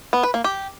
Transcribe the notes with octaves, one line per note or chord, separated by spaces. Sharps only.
B3
B4
A#3
G4